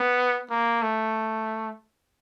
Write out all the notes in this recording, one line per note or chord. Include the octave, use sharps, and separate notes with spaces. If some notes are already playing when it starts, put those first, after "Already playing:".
Already playing: B3
A#3
A3